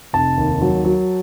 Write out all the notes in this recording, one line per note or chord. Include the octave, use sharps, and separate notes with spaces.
F1 A5
D#2
F#3
F#3